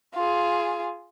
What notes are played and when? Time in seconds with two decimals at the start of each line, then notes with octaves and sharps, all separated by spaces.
0.15 F4 G#4